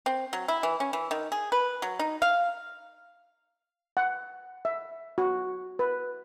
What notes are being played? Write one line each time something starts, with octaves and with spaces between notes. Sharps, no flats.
C4
F#3
E4
E3
C#4
E3
D#3
G#4
B4
F#3
D#4
F5
F#5
E5
F#4
B4